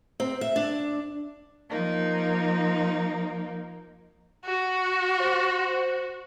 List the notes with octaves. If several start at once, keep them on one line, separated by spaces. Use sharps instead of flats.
C4
E5
D4
F3 A#3 D#4
F#4
C5